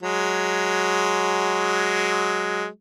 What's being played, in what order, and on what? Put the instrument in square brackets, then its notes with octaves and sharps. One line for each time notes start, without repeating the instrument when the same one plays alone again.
[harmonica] F#3 G#3